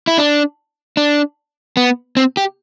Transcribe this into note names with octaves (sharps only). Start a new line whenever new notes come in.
E4
D4
D4
B3
C4
G4